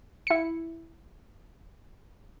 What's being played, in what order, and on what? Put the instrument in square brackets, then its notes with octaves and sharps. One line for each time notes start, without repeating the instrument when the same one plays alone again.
[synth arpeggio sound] E4 C#7